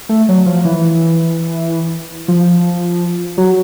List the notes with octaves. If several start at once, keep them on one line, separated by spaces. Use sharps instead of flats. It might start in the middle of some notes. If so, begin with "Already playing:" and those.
A3
F#3
F3
E3
F3
F#3